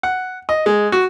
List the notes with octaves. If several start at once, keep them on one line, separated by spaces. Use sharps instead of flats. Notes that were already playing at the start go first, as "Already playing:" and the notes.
F#5
D#5
G#3
F#4